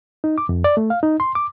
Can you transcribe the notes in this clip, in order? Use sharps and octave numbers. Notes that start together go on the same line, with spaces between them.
D#4
D6
F2
D5
A3
F5
D#4
C6
D6